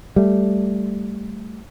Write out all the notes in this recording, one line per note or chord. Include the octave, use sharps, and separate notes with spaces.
G3 A3